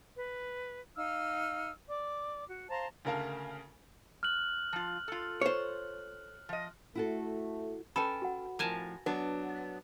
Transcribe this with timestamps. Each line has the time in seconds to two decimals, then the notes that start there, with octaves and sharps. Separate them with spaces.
0.16 B4
0.97 D#4 F5 E6 F6
1.89 D5 D6
2.47 F#4
2.69 C5 F5 A5 A#5
3.05 D2 C#3 A#4 F5 A5
4.23 F6 F#6 F#7
4.73 F3 F4
5.08 F4 A4
5.41 C5 C#5
6.49 F3 D#5
6.95 A3 E4 F#4 A4
7.96 C#4 A4 B4 G5 G#5 B5
8.22 F#4 F#5
8.59 F2 A2 F3 A#4 G#5 A5
9.06 F#3 B3 D4 B4